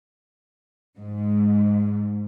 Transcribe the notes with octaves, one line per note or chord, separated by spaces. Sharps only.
G#2